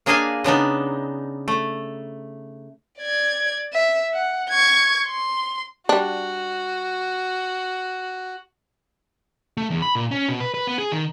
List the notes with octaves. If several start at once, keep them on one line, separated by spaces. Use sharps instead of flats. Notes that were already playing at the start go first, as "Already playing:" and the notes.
A#3 D4 G#4 D#5 F5 G#5
C#3 B3 D4 D#4
A3
D5 G#6
E5
F#5
C#6 G#6
C6
G3 D4 F#4
A3
E2
B5
A#2
C#4
B2
B4
B4
B3
G#4
D#3